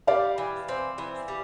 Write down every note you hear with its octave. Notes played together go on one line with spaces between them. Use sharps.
G3 D5 F5
E3
C4
E3
G3